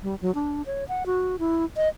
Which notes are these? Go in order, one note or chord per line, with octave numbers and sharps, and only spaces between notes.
G3
F#3
D4
C#5
F#5
F#4
E4
D#5